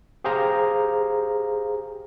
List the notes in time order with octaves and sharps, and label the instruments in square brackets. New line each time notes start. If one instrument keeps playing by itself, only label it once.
[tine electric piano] G4 G#4 C5 F5 A#5